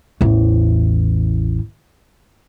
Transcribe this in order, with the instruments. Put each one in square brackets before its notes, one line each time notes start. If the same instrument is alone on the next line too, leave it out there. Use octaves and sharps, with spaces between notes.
[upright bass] A1 E2